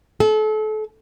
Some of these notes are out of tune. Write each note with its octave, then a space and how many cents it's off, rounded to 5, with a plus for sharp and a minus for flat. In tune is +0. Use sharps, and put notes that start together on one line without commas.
A4 -35